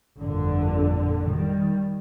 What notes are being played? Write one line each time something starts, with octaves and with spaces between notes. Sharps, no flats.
G1 F2 A#2 D3
D#3 G3